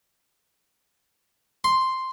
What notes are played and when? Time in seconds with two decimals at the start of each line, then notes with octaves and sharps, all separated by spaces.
1.64 C6